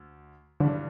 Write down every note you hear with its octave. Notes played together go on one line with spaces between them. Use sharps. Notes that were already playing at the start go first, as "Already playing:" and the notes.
Already playing: D2
G2 D3 E3 G3 D4